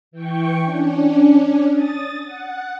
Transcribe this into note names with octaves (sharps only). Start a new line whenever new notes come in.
E3 G5 C#6
C#4 D4
D#6 A6
F#5